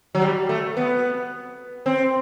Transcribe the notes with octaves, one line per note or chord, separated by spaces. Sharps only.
F#3
G3
A3
B3
C4